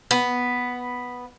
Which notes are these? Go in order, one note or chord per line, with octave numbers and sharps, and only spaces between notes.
B3